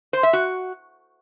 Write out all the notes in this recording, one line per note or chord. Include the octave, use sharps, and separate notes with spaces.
C5
E5
F#4